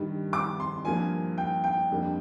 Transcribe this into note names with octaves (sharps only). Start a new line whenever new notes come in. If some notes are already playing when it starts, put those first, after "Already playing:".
Already playing: G2 D#3 G3
D6
C6
G2 F3 A#3 G#5
G5
G5
F2 D3 G3 A#3